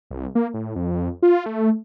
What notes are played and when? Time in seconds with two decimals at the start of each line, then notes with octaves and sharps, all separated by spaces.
0.11 C2
0.35 A#3
0.54 A2
0.75 F2
1.22 F4
1.46 A3